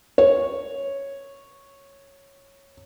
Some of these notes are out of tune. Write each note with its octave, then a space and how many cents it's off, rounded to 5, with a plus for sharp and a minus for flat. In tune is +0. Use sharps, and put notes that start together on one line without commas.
C#5 -5